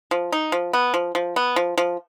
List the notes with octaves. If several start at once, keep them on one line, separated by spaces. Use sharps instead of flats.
F3
D#4
F3
B3
F3
F3
B3
F3
F3